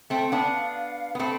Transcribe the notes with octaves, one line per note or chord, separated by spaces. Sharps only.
A3 C4 G5
B3 D4 F5
B3
A3 C4 B5